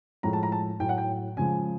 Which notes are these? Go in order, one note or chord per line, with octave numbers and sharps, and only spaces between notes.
A2 F3 G#3 A#5
A5
A#5
A5
A2 F#3 G5
F#5
G5
C#3 F3 G#3 G#5